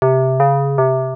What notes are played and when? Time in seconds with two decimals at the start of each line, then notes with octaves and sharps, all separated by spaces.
0.02 C3
0.40 C#3
0.78 C3